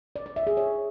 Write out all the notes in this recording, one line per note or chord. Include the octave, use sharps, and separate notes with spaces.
D5
D5
E5
G#4
C#5